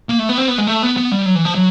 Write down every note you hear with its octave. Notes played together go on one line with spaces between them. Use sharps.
A#3
A3
B3
C4
B3
G#3
A3
B3
B3
G3
F#3
E3
F3
F#3